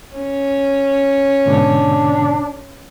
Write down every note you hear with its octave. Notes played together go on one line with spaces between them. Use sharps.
C#4
G#2 B2 D3 D4